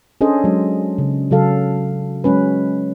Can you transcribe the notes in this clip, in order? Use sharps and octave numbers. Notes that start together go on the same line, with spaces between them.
C#4 D4 G#4 A4 C5 D#5
F#3 G#3
C#3
C#3 F#3 A4 F5
F#3 G#3 C#4 B4